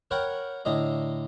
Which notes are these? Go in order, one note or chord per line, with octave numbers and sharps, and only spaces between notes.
A#4 C#5 F#5 G5 B5
A2 D3 D#5 A#5